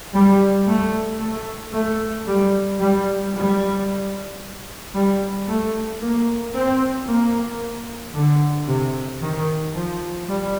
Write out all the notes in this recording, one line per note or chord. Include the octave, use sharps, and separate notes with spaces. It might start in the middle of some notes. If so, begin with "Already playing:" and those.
G3
A3
A3
A3
G3
G3
G3
G3
A3
A#3
C4
A#3
D3
C3
D#3
F3
G3